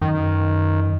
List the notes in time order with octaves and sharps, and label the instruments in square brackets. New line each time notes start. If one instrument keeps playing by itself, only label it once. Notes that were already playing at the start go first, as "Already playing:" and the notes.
[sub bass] F#2 [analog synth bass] D#3